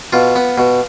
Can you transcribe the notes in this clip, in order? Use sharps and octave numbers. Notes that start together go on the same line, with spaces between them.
B2 F4
B3
B2